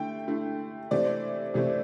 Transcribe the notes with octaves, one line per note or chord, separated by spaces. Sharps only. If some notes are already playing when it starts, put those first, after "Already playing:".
Already playing: D3 A3 E4 G5
D3 A3 E4
C3 E3 A3 C4 D5
C3 E3 A3 C4